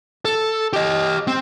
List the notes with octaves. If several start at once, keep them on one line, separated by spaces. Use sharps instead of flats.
A4
G4 D#5
C4